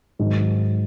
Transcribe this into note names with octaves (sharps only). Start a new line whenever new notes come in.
G#2 D#3 F#3